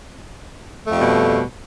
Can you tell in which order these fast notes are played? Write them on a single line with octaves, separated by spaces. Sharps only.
A3 F2 G3 B2